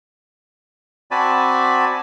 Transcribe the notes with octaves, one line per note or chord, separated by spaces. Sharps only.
C4 F#4 D5 G#5 A5 B5